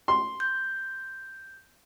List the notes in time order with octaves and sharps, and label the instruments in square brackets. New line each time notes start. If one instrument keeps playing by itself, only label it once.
[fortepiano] C6
[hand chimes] G6